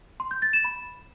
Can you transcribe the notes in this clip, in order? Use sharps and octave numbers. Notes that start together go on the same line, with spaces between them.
C6
G6
A6
E7
B5